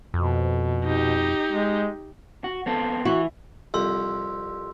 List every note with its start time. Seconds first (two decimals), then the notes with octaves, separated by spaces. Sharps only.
0.14 F2 B2
0.85 D#4 G4
1.51 G#3
2.44 F#4
2.66 B3 C4 A4
3.05 E3 E4 F#4
3.74 C2 F2 C6 E6